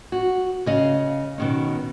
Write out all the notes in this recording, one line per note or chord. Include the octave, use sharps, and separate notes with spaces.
F#4
C#3 D#5 F5
B2 D#3 C#4